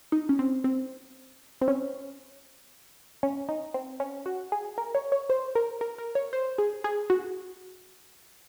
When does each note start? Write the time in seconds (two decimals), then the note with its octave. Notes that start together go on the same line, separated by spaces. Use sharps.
0.12 D#4
0.29 C#4
0.39 C4
0.64 C4
1.62 C4
1.68 C#4
3.23 C#4
3.49 D#4
3.74 C4
4.00 C#4
4.26 F#4
4.52 G#4
4.78 A#4
4.95 C#5
5.12 C#5
5.30 C5
5.55 A#4
5.81 A#4
5.98 A#4
6.15 C#5
6.33 C5
6.58 G#4
6.84 G#4
7.10 F#4